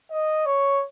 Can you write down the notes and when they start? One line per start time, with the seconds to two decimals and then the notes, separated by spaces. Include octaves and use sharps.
0.11 D#5
0.45 C#5